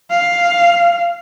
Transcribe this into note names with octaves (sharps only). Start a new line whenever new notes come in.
F5